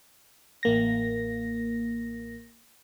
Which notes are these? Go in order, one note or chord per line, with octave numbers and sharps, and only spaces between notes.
A1 A#3 A#6